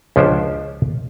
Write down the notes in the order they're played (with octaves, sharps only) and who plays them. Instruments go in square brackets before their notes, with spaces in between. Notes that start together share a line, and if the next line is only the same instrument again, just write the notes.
[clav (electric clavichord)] C#2 F3 C#4 D4 C5